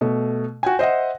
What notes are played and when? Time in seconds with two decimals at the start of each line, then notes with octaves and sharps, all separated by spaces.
0.01 B2 A3
0.63 F#4 G5 G#5
0.79 C5 D#5 E5 F#5